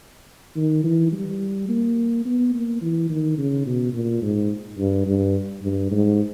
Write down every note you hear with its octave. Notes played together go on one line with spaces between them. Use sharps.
D#3
E3
G3
A#3
B3
A#3
E3
D#3
C#3
B2
A#2
G#2
G2
G2
G2
G#2